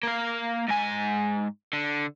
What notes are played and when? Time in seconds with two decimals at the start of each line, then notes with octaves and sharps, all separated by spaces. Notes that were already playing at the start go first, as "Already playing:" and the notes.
0.03 A#3 F5
0.68 G#2 G#5
1.73 D3